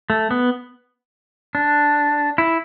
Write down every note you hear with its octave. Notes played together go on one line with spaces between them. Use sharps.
A3
B3
D4
E4